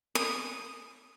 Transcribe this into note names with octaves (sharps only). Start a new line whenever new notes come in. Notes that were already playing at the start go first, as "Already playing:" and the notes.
D#6